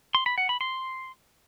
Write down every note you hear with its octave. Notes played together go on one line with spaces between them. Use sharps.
C6
B5
F#5
B5
C6